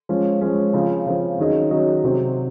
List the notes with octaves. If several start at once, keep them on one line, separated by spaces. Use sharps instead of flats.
F3 G#3 C#4
F3 G#3 C#4
C#3 F3 C4
C#3 F3 C4
D#3 F#3 C#4 G#4 D#5
D#3 F#3 C#4 G#4 D#5
C3 F#3 C4